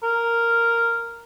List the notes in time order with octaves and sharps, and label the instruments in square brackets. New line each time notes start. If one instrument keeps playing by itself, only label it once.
[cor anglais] A#4